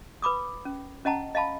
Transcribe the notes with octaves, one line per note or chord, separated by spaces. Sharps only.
B4 B5 D6 D#6
C#4
C#4 D#5 F#5 A5 A#5
D#5 F5 A5 B5